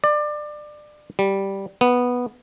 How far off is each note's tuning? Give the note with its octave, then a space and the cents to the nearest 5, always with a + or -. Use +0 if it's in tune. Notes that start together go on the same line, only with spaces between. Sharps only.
D5 +25
G3 -5
B3 -5